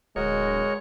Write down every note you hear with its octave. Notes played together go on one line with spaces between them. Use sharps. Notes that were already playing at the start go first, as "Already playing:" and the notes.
D1 G#3 F#4 A#4 C#5 D#5